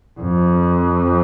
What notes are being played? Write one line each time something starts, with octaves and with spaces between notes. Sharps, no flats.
F2